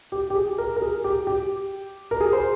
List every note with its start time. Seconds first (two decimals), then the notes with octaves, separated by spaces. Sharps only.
0.12 G4
0.30 G4
0.35 G#4
0.58 A#4
0.76 A#4
0.82 G#4
1.04 G4
1.27 G4
2.11 A#4
2.20 G#4
2.33 C5